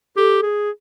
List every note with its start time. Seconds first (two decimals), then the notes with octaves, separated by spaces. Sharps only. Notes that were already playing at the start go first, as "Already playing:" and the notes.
0.16 G4 A4
0.43 G#4